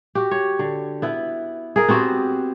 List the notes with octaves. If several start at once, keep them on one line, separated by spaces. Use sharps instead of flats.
F#4 G4
C#5
D3
B3 E4 B4
G#4 A#4
B3 C4 F#4 G4